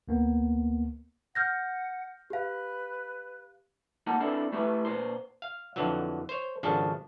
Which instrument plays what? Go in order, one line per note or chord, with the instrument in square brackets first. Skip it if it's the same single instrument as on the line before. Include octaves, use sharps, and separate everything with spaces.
[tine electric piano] D2 A#3 B3
[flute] F#5 [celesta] F6 G6 A#6
[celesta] G4 F5 [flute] B4
[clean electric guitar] A#3 D#4 F#5 A5
C3 C4 D4 E4 A4 B4
A3 E4 G4 A4 B4 E5
A#2 B4 C5 C6
[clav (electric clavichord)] F5
F2 D3 E3 F#3
C5 C#5
G#1 C#3 F3 D4 A4